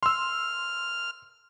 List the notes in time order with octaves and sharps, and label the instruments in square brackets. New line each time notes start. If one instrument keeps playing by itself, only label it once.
[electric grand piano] C6 E6 [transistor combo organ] F6